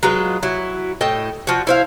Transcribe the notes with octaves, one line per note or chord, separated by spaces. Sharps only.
F#3 G#3 F4 B4
F#3 E4
A2 A4 D#5 G5
F3 F#4
E4 C5 F5